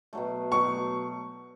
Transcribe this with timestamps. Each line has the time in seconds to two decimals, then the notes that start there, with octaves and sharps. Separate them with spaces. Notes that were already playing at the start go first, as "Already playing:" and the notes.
0.13 B2 F#3 A3
0.51 B2 F#3 A3 C#6